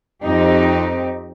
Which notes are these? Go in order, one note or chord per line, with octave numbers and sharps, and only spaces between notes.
F2 C4 D#4 G4